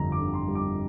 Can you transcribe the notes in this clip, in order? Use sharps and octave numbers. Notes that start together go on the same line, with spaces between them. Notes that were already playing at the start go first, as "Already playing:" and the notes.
Already playing: G1 F2 D3 G3 A#5
D6
D3
C6
G3
D6